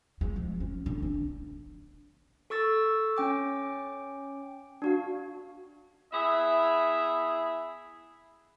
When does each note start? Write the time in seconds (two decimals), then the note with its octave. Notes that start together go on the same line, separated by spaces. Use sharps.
0.21 G#3
0.36 F3
0.60 C#4
0.86 D3
1.02 D4
2.50 A4 C#6 E6 A6
3.17 C#4 G5 D6
4.82 D4 F#4 F5
6.12 B3 E4 G#4 E5